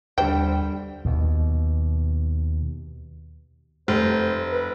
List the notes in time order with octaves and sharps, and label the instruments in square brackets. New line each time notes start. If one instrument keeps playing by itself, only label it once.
[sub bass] D#2 [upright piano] D3 G3 [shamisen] C5 G5
[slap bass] D#2 B2
[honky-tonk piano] F1 [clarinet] C5
[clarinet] B4